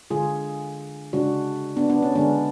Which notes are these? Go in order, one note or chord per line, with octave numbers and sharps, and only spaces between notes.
D3 G#3 F4 G#4
C#3 G#3 D4 F#4
B3 D4
B3 D4
C#4
D3 G#3 B3 D4